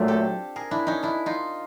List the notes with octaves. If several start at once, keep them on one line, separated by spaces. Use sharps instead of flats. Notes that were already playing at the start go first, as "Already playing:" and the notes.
Already playing: A#2 F#3 A3 C4 D4 F4
G4 A4
G#4 A#4
D4 E4
C#4 D#4
D4 E4
D#4 F4